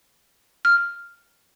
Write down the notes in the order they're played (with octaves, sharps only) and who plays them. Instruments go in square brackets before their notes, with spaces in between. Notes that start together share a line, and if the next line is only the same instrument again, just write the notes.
[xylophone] F6